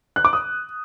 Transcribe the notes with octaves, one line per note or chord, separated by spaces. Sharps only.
F#6
D6
D#6